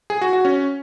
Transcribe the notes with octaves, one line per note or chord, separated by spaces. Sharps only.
G#4
F#4
F#4
C#4